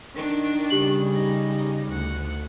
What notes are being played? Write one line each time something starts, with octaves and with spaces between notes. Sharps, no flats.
D#3 D4
C#3 G3 G4 F#7
D#4
D2 F#5